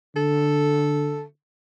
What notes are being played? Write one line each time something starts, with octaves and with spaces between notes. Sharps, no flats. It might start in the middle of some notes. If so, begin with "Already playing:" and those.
D3 A4